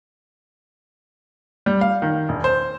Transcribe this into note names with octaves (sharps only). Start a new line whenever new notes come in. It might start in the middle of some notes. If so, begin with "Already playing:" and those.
G3
F5
D#3
E1
C5